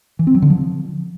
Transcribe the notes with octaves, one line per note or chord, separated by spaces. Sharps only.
E3
C4
F#3
D3
F3